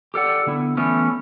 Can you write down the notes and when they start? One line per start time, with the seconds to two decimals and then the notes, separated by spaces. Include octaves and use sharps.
0.14 G4 A4 D5 F#5
0.47 D3 B3 E4
0.77 E3 A3 B3 C#4